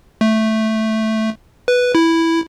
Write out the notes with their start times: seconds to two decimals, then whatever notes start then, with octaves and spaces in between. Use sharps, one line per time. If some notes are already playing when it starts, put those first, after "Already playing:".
0.21 A3
1.68 B4
1.95 E4